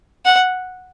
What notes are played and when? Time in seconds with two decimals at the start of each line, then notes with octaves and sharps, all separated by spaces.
0.25 F#5